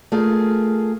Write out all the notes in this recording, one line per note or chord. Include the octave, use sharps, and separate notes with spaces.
A3 F4 G#4 A#4